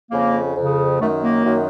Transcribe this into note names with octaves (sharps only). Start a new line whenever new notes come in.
F2 C#3 A#3
F2 C#3
F#2 D#3 A3
A#3
F#2 D#3